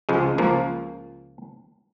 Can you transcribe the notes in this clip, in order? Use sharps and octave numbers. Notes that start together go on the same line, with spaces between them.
C#2 F3 G#3
C#2 F3 A#3